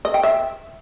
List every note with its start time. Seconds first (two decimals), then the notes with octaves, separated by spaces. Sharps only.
0.05 D#5
0.14 G5
0.23 E5